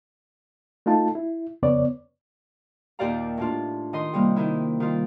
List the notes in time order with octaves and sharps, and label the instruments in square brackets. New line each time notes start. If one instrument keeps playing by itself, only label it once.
[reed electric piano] A3 D#4 F4 A5
E4
F2 C#3 B3 C#5 D5
[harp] D#2 A#2 G4 D5 F5 A#5
A2 D4 F4
D#3 D#5 C6 D#6
C3 G3 A#3
D#3 D#4 E4
D#3 F4